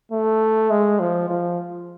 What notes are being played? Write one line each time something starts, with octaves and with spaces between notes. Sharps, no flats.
A3
G#3
F3
F3